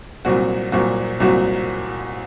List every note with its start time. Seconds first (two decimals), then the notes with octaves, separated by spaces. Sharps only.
0.25 C2 A#2 F#3 C4 F#4
0.72 C2 A#2 F#3 C4 F#4
1.20 C2 A#2 F#3 C4 F#4